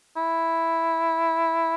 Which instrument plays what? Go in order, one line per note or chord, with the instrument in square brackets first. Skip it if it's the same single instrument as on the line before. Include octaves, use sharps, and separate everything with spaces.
[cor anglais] E4